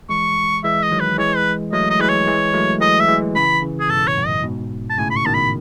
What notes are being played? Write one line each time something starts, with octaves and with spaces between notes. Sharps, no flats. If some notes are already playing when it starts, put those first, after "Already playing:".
E3 G#3 C#6
E3 G#3 E5
D#5
D#3 F#3
B4
E3 G#3 C#5
B4
F#3 A3 D#5
D#5
E3 G#3 B4
C#5
E3 G#3
F#3 A3
E3 G#3 D#5
E5
E3 G#3
C#3 E3 B5
C#3 E3
G#4
G#2 B2 A4
C#5
F#2 A2
D#5
G#2 B2
A5
A2 C#3 G#5
B5
C#6
B2 D#3 A5
B5